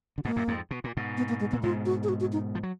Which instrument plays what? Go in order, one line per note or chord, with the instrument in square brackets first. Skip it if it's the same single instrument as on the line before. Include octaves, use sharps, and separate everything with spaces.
[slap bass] D3
[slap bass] G#2 B2 [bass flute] A#3
[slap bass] F#2 A#2
F2 G#2
B2
A#2
G#2 B2
[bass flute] B3
A#3
G#3
[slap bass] A#2 [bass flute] B3
[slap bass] G#2 B2 [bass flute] F4
[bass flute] F#4
G#4
F#4
F#4
D#4
[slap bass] F3
F#3